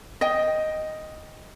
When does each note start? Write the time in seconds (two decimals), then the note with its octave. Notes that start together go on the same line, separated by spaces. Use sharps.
0.21 D#5 G5